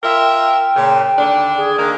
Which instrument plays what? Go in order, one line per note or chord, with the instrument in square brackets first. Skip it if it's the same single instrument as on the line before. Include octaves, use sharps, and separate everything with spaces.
[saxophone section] F4 A#4 E5 [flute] G5
[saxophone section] A#2 C#3
D#2 D3 D4
[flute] G#4
[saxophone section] D3 D#3 A#3